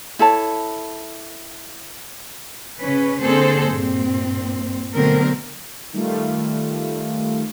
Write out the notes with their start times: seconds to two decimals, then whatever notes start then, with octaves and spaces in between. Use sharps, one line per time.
0.19 E4 A4 C#5 A5
2.80 C#3 C#4 B4
3.21 D3 A#3 C4 G#4 A4 C5
3.71 G2 A#2 C4
4.94 B2 D3 F#3 A3 C4 A#4
5.93 D#3 G3 A3 F4